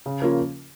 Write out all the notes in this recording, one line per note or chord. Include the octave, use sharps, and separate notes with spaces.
C#3
F3 A#3 C#4 F4